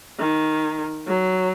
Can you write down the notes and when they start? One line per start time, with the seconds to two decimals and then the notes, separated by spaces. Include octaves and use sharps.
0.19 D#3
1.08 F#3